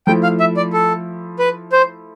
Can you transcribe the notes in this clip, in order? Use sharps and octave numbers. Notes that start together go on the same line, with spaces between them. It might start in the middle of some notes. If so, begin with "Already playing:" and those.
F3 A3 E4 G5
F5
E5
D5
A4
B4
C5